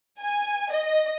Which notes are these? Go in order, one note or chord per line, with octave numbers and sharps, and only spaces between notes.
G#5
D#5